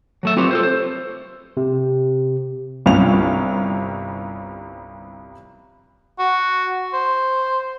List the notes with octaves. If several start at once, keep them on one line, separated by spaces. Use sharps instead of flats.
F#3 A3 E5
C4 F4 G4 B4 C#5
A4 A#4 C5
C5
C3
G1 C2 G2 C#4 F4 F7
F#4
C5